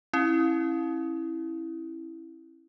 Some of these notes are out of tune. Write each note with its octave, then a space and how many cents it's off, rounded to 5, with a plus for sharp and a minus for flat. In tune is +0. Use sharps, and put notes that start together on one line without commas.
C#4 -35 E4 +0